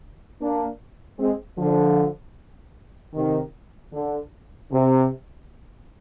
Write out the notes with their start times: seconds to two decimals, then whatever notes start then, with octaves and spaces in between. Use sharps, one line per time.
0.41 A#3 D4
1.20 G#3 C4
1.58 D3 F3
3.15 C3 D#3
3.93 D3
4.71 C3